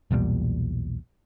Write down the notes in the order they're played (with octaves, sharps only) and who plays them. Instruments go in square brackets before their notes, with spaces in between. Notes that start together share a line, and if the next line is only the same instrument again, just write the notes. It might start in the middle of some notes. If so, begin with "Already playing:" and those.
[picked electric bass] B1 E2 A#2 G3